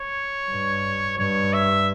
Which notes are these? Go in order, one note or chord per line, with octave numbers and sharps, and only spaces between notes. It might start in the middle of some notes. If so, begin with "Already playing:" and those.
Already playing: C#5
G2
G2 C#5
E5